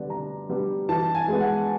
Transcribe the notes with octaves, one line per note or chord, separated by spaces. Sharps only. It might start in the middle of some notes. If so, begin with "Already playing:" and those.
Already playing: D3 G3 B3 D4
D3 A#5
G3 B3 D4
E3 A5
G#5
G#3 B3
F#5